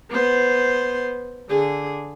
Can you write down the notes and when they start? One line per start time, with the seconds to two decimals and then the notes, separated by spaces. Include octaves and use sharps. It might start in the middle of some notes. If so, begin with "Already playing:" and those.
0.10 B3 C5
1.50 D3 G#4